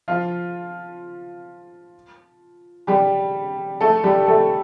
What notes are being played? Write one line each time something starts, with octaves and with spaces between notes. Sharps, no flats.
F3 F4
G3 G4
A3 A4
G3 G4
A3 A4